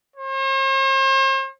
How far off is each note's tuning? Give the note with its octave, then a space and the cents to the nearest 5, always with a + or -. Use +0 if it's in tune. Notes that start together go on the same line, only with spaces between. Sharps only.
C5 +45